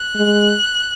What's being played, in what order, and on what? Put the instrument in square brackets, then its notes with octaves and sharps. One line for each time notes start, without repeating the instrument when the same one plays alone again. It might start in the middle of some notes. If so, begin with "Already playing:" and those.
Already playing: [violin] F#6
[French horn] G#3